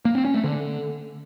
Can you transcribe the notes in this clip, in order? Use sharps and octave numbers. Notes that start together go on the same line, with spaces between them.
A#3
C4
C#4
A3
D3